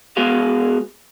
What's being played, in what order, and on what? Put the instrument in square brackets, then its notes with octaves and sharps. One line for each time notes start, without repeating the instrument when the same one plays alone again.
[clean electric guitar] G#3 B3 F#4 G#4 F5